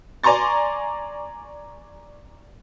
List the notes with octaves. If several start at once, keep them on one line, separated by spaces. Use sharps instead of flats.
D5 G#5 A#5 C6 C#6 A6